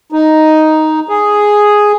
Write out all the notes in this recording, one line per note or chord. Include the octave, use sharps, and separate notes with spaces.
D#4
G#4